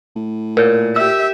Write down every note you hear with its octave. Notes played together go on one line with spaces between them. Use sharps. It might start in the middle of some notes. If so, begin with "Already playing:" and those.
A2
A#2 A#4 C#5
G4 E5 E6